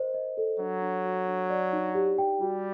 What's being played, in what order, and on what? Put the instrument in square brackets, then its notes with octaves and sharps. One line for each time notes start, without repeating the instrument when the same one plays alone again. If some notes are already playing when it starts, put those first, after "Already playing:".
Already playing: [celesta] A#4 C5 D#5
D#5
A4
[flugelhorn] F#3 [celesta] D4
[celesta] D4
F#4
D4
D5
D#4
G4
G5
[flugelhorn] G3 [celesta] F#4